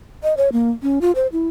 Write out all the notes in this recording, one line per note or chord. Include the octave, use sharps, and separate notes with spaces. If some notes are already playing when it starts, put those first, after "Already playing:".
D#5
C#5
A#3
C#4
F4
C5
E4